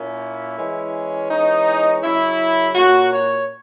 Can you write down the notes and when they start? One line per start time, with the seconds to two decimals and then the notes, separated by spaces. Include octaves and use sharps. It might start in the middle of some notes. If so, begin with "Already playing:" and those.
Already playing: A#2 A#3 C#4 E4
0.58 E3 G#3 C#4
1.30 E3 G#3 C#4 D#4
2.03 C#3 F#3 C#4 E4
2.75 A#2 A#3 C#4 F#4
3.12 C#5